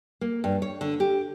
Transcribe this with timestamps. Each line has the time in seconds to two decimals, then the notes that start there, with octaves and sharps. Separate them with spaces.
0.21 A#3
0.44 G2
0.62 C#5
0.81 D3
1.00 G4